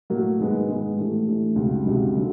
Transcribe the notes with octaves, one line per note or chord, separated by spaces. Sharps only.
A2 F#3 A#3
G#2 D#3 G#3 B3
G#2 D#3 G#3 B3
A2 E3 A3 D4 G4
A2 E3 A3 D4 G4
C#2 C3 D#3 F#3
C#2 C3 D#3 F#3
D3 F#3